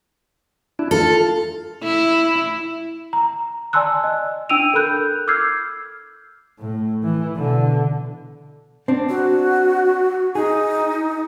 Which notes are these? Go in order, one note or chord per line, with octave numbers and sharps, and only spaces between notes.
D4 E4
F4 A4
E4
A#5
D5 G#5 A5 C6 E6 F#6
D#5
D4 G5 E6 D7 D#7 F7
A4 A#4 B5 F#6 G6
D6 E6 F6 G6 G#6 C7
A2
E3
B2 D3
C4 D4
F#4
D#4 G#4